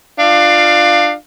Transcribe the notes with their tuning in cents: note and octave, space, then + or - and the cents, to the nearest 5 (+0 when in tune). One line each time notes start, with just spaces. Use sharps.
D4 +25 F4 +0 F5 +0